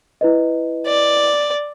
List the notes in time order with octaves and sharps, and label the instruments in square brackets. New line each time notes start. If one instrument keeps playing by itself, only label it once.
[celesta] E4 B4 D#5
[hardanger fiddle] D5